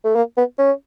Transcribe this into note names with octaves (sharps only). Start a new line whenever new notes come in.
A3
A#3
B3
C#4